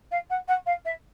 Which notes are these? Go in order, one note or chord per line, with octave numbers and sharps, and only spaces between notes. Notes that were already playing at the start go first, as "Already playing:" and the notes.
F5
F#5
F#5
F5
E5